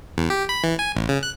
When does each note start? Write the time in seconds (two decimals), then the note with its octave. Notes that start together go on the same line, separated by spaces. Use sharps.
0.18 E2
0.30 G4
0.49 B5
0.64 E3
0.79 G#5
0.95 A1
1.08 C#3
1.23 F#6